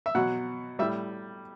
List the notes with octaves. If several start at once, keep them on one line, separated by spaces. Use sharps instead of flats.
E5
B2 F#3 F#5
A2 G3 E5